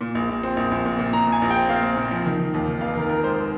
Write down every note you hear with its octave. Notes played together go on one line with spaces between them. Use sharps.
A#2
A#1
A#1
C4
A#1
A#1
A#2
A#2
A#2 A#5
A#2
G#5
A#1
G5
C4
A#2 F5
C4
A#2
F3
D#3
D#3
D#2
D#3
F1 F5
D#3 A#4
D#3 A#4
G#3 C5